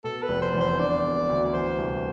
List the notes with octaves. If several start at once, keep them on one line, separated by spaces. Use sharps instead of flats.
B2 A4
B4
F1
C5
E2
C5
D3 D5
E1
D2
E3 C5
C2